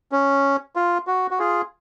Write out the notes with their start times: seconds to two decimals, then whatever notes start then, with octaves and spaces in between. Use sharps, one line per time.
0.12 C#4
0.76 F4
1.07 F#4
1.31 F#4
1.39 F4 G#4